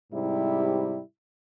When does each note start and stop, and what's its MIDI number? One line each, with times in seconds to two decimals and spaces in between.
0.13 0.99 44
0.13 0.99 48
0.13 0.99 55
0.13 0.99 64